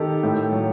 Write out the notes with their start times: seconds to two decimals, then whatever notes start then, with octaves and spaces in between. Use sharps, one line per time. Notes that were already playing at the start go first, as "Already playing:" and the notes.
Already playing: D#3 G4 A4
0.23 A2
0.53 F#3